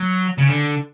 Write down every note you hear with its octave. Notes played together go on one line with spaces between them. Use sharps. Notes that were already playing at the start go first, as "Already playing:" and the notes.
Already playing: F#3
C#3
D3